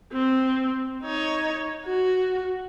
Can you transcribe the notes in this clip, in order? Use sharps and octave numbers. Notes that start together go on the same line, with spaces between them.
C4
D#4 C#5
F#4